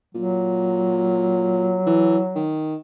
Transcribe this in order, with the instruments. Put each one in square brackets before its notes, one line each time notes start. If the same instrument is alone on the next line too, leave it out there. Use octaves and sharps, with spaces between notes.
[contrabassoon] A#2 [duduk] F#3
[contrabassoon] E3
D#3